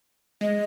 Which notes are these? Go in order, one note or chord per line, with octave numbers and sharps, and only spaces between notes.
G#3 D#5